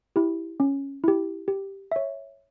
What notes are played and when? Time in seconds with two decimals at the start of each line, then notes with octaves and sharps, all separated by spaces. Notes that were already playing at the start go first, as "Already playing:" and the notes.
0.16 E4 G4
0.60 C#4
1.04 E4 G4
1.48 G4
1.92 C#5 E5